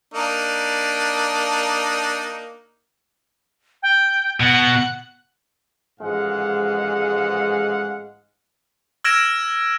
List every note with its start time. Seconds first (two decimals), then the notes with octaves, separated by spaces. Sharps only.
0.14 A#3 D4 D#4
3.83 G5
4.40 B2 F#5
6.00 A1 G#2 F3 G#3 F5 F#5
9.04 E6 F6 G#6 A#6 D7 E7